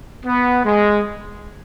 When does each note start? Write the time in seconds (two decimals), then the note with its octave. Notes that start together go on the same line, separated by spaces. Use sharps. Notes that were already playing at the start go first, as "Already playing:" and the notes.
0.25 B3
0.64 G#3